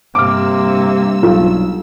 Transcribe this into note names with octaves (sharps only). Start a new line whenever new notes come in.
G2 C3 A#3 D6 E6 F6
B1 F4